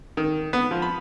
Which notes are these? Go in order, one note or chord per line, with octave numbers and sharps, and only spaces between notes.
D#3
B3
F3
B5